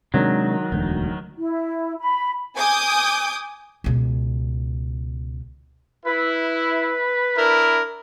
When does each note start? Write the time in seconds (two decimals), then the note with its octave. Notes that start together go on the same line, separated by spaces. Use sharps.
0.14 C3 D#3 F#3 G#3 D4
0.72 E1 D2
1.38 E4
1.99 B5
2.57 G#5 D6 D#6 G6
3.84 C#2 B2
6.06 E4 B4
7.38 D4 E4 A#4